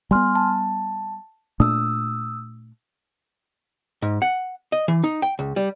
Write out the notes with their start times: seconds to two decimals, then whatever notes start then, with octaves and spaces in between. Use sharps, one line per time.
0.11 G3 G#3 B3 G#5 C6 F6
0.35 A5
1.60 A#2 A3 D4 D#6 E6
4.02 G#2
4.22 F#5
4.72 D#5
4.88 E3
5.04 D#4
5.22 G5
5.39 C#2
5.56 G3